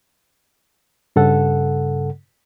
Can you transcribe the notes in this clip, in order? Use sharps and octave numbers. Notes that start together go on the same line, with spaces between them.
G2 C#3 A4 F#5